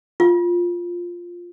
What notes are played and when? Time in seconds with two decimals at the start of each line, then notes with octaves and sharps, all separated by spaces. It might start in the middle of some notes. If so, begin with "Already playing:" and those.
0.20 F4